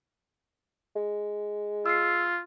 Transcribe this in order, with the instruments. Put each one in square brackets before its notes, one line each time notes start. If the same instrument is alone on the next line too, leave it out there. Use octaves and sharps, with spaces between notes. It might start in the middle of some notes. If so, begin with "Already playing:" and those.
[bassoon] G#3
[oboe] F4 [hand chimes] E6 C7